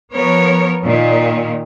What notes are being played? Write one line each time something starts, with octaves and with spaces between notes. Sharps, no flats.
F3 B3 A#4 C#5
A#2 D#3